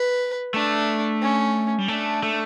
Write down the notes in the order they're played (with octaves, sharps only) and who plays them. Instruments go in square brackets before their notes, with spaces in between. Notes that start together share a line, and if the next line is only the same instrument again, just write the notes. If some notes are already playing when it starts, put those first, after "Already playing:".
Already playing: [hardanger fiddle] B4
[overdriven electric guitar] A3 [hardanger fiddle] D4
[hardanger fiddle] C#4
[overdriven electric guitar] G3
[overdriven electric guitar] A3 [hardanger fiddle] D4
[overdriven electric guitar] A3